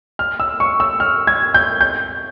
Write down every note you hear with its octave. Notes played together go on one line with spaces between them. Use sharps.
F6
E6
C#6
E6
F6
G#6
G6
G6